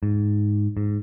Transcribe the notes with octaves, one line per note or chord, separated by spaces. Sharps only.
G#2
G#2